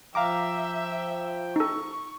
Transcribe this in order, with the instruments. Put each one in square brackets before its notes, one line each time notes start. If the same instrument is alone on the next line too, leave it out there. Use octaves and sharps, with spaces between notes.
[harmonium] F3 G5 [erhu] E5 [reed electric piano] F5 A#5 D6
[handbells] D#4 A4 [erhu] C#6